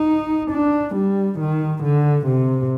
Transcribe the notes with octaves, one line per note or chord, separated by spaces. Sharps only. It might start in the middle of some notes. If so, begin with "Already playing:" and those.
Already playing: D#4
D4
G3
D#3
D3
C3